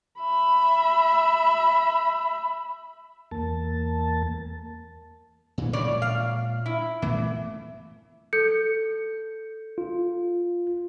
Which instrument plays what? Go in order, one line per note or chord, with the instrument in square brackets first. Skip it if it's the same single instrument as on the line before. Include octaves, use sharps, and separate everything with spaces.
[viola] E5 B5
[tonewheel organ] E2 A#3 A5
[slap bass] A#2 E3 F#3
[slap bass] A#2 G#3 [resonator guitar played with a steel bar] C#3 C#5 D5
[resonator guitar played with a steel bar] F5
E4
[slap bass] A#2 A3 B3 [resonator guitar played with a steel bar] E3
[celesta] A4 G6 C#7
[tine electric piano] F4